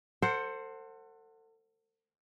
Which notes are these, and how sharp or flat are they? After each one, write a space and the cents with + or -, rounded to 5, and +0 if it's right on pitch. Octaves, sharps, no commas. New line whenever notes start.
A4 +40 C5 +10 F#5 +0